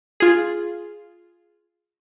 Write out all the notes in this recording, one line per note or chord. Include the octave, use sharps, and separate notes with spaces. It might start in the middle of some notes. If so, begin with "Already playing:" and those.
F4 G#4